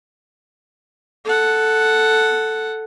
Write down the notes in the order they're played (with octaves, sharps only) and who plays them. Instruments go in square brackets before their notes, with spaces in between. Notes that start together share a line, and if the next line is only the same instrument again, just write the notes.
[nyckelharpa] A4 F#5